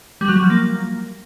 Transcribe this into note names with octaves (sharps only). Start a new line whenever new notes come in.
G3
F#3
G3
F3
A#3